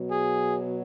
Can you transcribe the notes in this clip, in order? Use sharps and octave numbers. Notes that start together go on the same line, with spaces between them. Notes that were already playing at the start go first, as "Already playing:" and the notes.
Already playing: B2 F#3
G#4